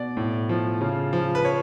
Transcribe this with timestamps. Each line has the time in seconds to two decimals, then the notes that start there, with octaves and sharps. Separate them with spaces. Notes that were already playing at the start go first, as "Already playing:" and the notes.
Already playing: B2 D5
0.17 A2
0.49 F3
0.81 C#3
1.13 F3
1.35 B4
1.45 C#5